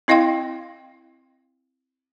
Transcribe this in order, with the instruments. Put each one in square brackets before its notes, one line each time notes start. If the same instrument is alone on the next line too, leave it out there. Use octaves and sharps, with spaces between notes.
[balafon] C4 E4 D#5 F5 G5 C6